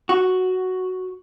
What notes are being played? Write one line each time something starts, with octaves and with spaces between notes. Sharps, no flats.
F#4